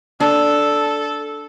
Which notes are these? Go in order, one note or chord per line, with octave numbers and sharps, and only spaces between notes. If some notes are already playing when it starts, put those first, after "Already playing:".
D4 A4